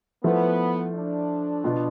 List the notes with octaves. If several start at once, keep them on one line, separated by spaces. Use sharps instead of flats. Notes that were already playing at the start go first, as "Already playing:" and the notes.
F3 A3 B3 E4
D4
B2 B3 F4